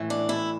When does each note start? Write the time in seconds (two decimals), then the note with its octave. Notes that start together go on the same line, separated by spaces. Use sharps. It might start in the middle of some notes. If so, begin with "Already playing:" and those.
Already playing: A2 E3
0.10 D4
0.29 E4